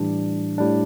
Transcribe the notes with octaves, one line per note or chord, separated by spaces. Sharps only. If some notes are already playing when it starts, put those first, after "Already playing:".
Already playing: A2 E3 G3 D4
A2 G3 D4